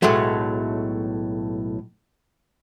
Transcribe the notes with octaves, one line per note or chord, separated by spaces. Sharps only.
B1 A2 F#3 G#3 A3